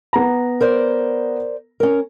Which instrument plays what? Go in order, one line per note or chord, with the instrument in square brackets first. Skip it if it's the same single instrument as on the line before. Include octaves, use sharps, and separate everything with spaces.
[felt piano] B3 A#5
[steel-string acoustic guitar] A#4 C5 D5
C#4 A#4